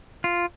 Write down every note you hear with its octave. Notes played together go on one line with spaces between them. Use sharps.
F4